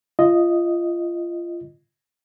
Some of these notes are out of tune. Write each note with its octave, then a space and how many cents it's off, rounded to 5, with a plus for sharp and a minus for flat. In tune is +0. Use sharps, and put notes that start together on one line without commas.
F4 -20 D#5 +0